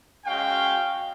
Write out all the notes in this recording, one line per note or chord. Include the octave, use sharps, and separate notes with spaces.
G#3 C#4 F#4 F5 G5